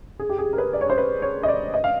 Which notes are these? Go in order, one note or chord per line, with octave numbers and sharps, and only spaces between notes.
G#4
G4
G#4
A#4
B4
D5
C#5
C5
B4
C#5
D#5
D5
D#5
F5